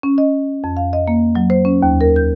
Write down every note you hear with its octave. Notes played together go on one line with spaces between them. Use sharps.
C#4
D#5
F2
F5
D#5
A#3
F#3
C5
C#4
D#2
A#4
G6